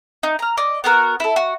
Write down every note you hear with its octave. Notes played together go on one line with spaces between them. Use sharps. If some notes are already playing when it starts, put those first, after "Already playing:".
D#4
A#5 F6
D5 D#5
B3 F#4 A#4
E4 A4
F#4